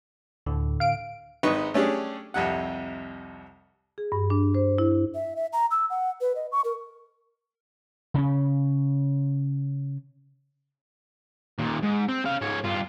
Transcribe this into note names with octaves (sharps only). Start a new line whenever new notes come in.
D2 A2 D3
F5 D7
G#1 D#4 B4 B5 C#6
A3 C#4 D4 G4 G#4
C2 F2 C3 F#5
G#4
G2
D4
C5
E4
E5
E5
A#5
E6
F#5
B4
D#5
C#6
A#4
C#3 C#4
D#2 A#2
G#2
C4
C#4 F5
G#2 C#5
G2 F4